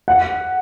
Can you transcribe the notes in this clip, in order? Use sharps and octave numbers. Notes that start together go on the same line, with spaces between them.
F#5